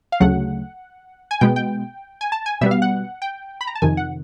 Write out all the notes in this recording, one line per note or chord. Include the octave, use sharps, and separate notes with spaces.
F5
D2 C#3 F#3 A3 F#5
G#5
B2 G#3 B3 G5
G5
G#5
A5
G#5
B2 G3 B3 E5
F5
F#5
G5
B5
A#5
A5
F2 C3 D#3 G#5
F#5